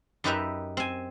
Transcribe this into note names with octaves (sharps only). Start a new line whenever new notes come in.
F#2 D#4 G4 B4 E5 A#5
C4 G#5